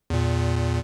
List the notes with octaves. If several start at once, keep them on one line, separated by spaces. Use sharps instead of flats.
E2 A#2